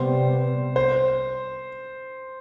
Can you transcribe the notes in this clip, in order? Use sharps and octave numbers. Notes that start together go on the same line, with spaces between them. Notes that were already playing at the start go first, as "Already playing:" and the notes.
Already playing: C3 G3 B3 C5
C5